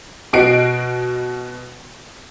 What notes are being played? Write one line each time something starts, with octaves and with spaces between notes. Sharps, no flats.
B2 F#4 D#5 C7 D7